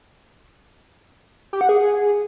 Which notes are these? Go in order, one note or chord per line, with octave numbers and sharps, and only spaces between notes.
G4
F#5
G#4